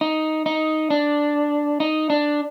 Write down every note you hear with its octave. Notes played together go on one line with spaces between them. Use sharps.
D#4
D#4
D4
D#4
D4